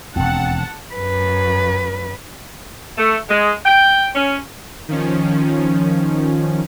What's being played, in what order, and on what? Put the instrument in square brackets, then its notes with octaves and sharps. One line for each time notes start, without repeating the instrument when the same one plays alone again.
[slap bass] E1 D#2 [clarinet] C4 [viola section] F#5 A5
[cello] F#2 B4
[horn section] A3
G#3
G5
C#4
[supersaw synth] D#3 F3 C#4